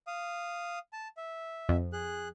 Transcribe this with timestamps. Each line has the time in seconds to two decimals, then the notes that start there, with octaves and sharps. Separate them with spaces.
0.07 F5 D#6
0.93 A5
1.17 E5
1.69 F2
1.93 G#4 F#6